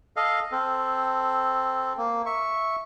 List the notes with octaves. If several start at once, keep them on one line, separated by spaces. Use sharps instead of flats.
A4 D#5 F5
C4 A4
A#3
E5 C#6